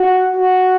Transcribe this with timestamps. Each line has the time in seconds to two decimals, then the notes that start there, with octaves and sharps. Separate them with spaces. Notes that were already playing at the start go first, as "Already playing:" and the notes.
Already playing: F#4
0.37 F#4